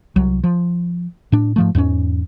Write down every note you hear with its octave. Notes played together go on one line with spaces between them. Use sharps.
C2 F#3
F3
A2 D4
G#2 F3 A3
E2 G#2 G3 C#4